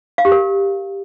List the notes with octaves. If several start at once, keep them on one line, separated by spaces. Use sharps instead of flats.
F5
G4
A#4